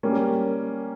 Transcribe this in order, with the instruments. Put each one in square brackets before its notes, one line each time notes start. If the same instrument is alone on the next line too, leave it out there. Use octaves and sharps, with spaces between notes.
[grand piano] G3 A#3 C#4